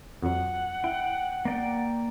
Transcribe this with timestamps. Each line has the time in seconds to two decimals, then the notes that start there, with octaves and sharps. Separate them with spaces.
0.22 F2 F#3 F#5
0.84 E4 G5
1.45 A#3 D5 G5